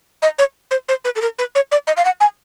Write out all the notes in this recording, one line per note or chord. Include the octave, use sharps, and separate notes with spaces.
D#5
C#5
C5
C5
B4
A4
A#4
B4
C#5
D5
D#5
F5
F#5
G#5